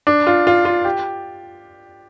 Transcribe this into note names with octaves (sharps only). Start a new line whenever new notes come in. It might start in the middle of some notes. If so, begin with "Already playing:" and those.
D4
F4
F4
F4
G4